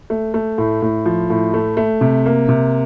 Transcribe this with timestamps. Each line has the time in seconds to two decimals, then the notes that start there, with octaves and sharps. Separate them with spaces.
0.10 A3
0.34 A3
0.58 A2
0.82 A2
1.06 F3
1.30 A2
1.54 A3
1.77 A3
2.01 C3
2.26 A#3
2.49 C3